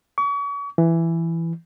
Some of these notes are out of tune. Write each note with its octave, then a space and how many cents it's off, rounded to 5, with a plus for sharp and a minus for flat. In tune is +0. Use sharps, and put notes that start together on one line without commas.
C#6 +40
E3 +10